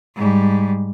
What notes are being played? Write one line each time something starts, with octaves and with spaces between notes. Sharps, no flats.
G#2 G3